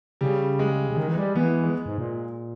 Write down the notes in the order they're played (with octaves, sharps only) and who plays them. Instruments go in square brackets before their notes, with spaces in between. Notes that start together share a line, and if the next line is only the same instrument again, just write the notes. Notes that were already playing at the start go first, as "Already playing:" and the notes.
[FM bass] C#3 [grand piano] G3
[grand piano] G#3
[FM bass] C#3
D#3
E3
G3
[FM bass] E3 [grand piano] B3
[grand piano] G#3
[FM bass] G#2
A#2